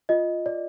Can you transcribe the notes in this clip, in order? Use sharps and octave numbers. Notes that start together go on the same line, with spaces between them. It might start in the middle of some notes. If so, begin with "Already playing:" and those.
F4 D#5
D5